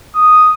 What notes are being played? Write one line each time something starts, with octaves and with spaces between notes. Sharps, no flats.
D#6